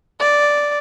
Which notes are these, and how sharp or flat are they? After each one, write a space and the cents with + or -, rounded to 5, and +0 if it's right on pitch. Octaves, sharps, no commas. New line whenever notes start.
D5 -5